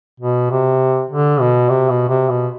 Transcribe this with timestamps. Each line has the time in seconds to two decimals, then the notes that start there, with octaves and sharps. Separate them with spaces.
0.20 B2
0.51 C3
1.10 D3
1.40 B2
1.69 C3
1.90 B2
2.09 C3
2.29 B2